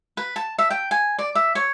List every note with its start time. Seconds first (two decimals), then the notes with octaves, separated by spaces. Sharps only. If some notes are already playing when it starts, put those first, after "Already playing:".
0.17 B4
0.36 A5
0.58 E5
0.70 G5
0.91 G#5
1.19 D5
1.35 E5
1.55 C#5